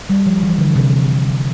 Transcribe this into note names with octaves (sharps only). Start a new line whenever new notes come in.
G3
F3
E3
D3
C3